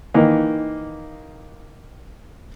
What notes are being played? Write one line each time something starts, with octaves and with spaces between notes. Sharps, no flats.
D#3 E3 A#3 D#4